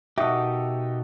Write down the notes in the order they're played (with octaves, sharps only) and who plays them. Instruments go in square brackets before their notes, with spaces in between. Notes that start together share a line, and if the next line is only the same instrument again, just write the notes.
[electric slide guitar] B2 D#4 A#4 [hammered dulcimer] F#4 A4 [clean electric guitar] G4 D#5 [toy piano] E5